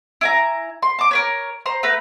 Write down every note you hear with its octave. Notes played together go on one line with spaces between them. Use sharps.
E4 G#5 A#5
C6
A5 D6
A#4 B4 C#5
C5 A#5 C6
A3 B4 A#5